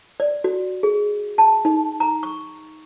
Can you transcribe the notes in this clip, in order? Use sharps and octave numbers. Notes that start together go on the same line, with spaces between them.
D5
F#4
G#4
A5
D#4
A#5
C#6